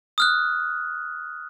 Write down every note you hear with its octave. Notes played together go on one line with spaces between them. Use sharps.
D#6 F6 F#6